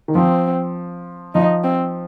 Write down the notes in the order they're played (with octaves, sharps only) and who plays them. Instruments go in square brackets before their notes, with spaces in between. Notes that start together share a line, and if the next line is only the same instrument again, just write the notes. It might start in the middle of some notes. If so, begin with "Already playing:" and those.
[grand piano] D#3
[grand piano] F3 [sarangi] C4
[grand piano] F3 [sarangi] D#4
[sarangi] C4